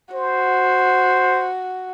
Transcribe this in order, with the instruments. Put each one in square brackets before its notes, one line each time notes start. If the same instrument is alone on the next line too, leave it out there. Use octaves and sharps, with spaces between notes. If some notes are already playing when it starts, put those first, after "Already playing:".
[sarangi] F#4 [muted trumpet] C5